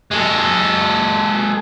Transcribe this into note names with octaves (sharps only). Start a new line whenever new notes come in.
G#3 A4